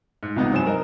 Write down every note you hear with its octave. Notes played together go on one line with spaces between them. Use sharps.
G#2
C#2 C3 B3 D#4
G2 F#3 C5 G#5 E7
A#4 D#5